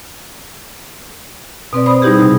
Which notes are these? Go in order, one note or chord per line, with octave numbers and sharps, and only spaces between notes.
B2 C4 B4 D5
C5 B5 D#6
G3 D#4 E4 G4 G#4
C3